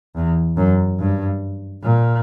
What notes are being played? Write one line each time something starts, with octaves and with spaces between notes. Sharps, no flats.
E2
F#2
G2
A#2